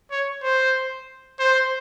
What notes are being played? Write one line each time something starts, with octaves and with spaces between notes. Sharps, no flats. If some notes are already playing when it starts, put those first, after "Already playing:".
C#5
C5
C5